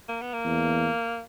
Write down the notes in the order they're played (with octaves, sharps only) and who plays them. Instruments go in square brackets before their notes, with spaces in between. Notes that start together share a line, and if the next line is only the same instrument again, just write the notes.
[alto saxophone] A#3
B3
A#3
[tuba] E2